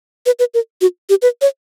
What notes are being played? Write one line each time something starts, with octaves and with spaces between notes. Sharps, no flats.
B4
B4
A#4
F#4
G4
B4
C#5